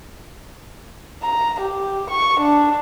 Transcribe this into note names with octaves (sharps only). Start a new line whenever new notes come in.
A#5
G4
C#6
D4